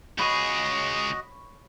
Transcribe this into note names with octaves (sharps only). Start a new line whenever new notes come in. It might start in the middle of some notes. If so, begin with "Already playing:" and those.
C#2 F#4 G#4 C#5 D#5 B5 C#6